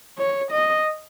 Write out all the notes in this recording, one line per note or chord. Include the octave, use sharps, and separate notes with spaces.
C#5
D#5